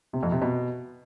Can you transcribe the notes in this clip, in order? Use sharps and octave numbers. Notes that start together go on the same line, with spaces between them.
C3
F2
C3
B2